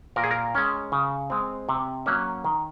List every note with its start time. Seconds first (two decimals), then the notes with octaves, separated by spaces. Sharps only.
0.16 A#2 A#4
0.24 G#4
0.31 A#4
0.55 G#3 C#4
0.92 C#3
1.30 G#3 C4
1.69 C3
2.06 F#3 A#3 C#4
2.44 D#3